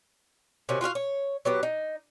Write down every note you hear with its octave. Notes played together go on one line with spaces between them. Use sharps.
C3 D#3 C#4 F#4
F4 F#4 G#4 F5
C#5
F#3 B3 G4
D#4